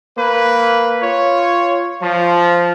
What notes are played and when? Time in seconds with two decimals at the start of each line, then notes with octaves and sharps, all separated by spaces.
0.17 A#3 B4
1.02 F4 C#5
2.02 F3